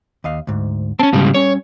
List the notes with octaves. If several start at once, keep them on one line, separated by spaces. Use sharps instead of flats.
D#2 D#5 F5
D2 G#2
C4 C#4 A5
G#2 C#3 G3
G3 C#4 C#5